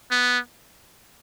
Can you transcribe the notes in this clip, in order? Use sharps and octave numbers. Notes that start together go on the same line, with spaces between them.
B3